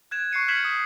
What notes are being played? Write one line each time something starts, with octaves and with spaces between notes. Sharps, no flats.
F#6 G#6 E7
C#6 F#6 C7 C#7 D#7
F6 G6 G#6 B6 E7 F#7
D#6